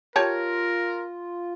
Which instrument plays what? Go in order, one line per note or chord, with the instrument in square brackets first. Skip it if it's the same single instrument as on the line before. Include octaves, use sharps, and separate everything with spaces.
[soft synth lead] F4 [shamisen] G4 C#5 A5 [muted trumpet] A#4